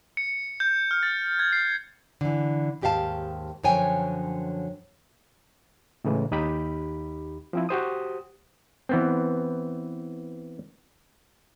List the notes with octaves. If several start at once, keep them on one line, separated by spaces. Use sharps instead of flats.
C#7
G6
F6
A6
G#6
C7
D3 E3
D#2 G#2 G4 E5 F5 A5
F#2 D3 F3 C#5 G5 G#5
A2 C#3 E3 G#3
D#2 D#4 G4 B5
F3 C4 E4
F#4 G4 C5 D#6
E3 B3 C4